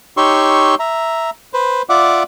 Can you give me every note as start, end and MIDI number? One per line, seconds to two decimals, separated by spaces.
0.17 0.75 63
0.17 0.75 67
0.17 0.75 73
0.17 0.75 84
0.17 0.75 85
0.17 0.75 88
0.79 1.30 76
0.79 1.30 82
1.54 1.82 71
1.54 1.82 72
1.89 2.23 65
1.89 2.23 74
1.89 2.23 76
1.89 2.23 78
1.89 2.23 86